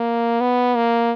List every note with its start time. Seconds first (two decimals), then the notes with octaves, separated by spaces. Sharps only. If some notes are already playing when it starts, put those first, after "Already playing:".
Already playing: A#3
0.40 B3
0.75 A#3